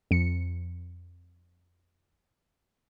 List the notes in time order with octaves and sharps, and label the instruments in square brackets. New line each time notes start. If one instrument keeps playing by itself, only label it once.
[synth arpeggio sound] F2 F3 C#7